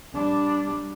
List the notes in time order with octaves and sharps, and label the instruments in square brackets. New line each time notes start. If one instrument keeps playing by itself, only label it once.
[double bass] G3 D4